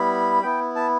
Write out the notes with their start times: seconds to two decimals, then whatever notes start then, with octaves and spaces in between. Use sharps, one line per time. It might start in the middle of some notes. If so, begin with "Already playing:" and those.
Already playing: G3 B3 E4 B5
0.43 B3 E4 G5
0.76 A5